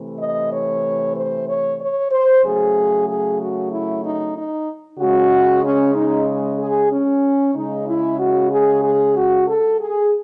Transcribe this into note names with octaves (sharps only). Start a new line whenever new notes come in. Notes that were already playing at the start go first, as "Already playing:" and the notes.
Already playing: C3 E3 A3
D#5
C#5
C5
C#5
C#5
C5
C#3 F#3 A3 G#4
G#4
F#4
E4
D#4
D#4
C#3 G#3 F#4
C#4
D#4
G#4
C#4
C#3 G#3 D#4
E4
F#4
G#4
G#4
F#4
A4
G#4